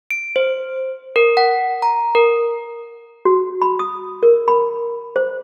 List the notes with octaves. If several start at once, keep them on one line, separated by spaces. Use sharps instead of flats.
D7
C5
A#4
F#5
A#5
A#4
F#4
B5
D#6
A#4
B5
C5